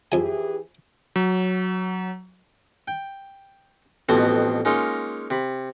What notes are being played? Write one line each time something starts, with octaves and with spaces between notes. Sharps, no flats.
F2 E3 G4 G#4 G#5
F#3
G5
A1 F2 B2 B3 C4 C5
G#3 A#3 C#4 D#4 F4
C3 B5